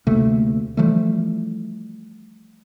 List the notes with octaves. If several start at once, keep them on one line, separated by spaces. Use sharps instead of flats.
D2 C3 A3 A#3
E3 F3 G3 A3